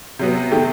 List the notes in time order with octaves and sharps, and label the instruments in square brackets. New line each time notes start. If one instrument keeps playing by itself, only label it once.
[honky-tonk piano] C3 F#3 B3
C3 D#3 A3 G4